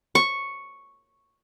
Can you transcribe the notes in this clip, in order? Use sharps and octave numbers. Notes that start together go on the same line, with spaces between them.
C#6